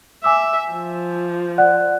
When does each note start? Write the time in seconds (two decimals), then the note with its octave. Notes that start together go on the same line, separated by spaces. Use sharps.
0.24 E5 G#5 D6 E6
0.72 F3
1.58 D5 F#5 F#6